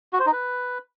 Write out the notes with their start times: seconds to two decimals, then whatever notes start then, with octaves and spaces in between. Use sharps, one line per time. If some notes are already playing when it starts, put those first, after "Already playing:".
0.13 F#4
0.20 C5
0.26 D#4
0.33 B4